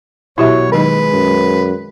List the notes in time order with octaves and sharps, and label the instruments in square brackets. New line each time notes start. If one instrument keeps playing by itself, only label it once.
[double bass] B2 F#3 [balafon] E4 G4 E5 [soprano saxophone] C#5
[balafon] D#3 F#3 D#4 [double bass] G#3 [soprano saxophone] B4
[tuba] F#2